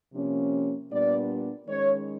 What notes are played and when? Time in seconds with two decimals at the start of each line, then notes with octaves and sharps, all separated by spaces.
0.14 C3 F3 A#3 C#4
0.90 A#2 G3 B3 D4 D5
1.67 D#3 G#3 C#4 C#5